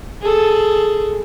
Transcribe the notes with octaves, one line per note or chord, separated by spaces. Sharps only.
G#4 A4